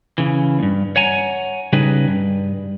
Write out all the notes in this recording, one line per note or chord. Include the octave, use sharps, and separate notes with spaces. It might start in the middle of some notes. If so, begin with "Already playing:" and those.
C#3 E3
D2 G2
C#5 F#5 G#5 A#5
C#3 G3 D#4 G#4 B4
G2